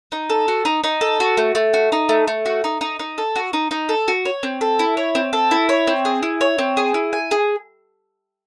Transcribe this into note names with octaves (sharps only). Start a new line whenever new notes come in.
D#4
A4
F#4
D#4
D#4
A4
F#4
A3
A3
F#4
D#4
A3
A3
F#4
D#4
D#4
D#4
A4
F#4
D#4
D#4
A4
F#4
C#5
C4
A4
E4
C#5
C4
A4
E4
C#5
C4
G#4
E4
C#5
C4
G#4
E4
G#5
G#4